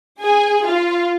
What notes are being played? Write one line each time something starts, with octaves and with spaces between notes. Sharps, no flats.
G#4 G#5
F4 F5